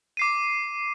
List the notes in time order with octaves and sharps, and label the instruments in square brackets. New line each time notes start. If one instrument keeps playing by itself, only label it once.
[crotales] D6 C7 D#7